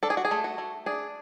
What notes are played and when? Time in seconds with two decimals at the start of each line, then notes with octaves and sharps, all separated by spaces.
0.03 D4 A4
0.10 G#4
0.17 F#4
0.25 G#4
0.31 A3
0.44 F#4
0.58 A3
0.86 D4 G#4